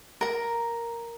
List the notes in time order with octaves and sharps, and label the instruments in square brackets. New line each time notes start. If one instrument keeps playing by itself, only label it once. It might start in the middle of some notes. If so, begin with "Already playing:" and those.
[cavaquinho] A#4 A#5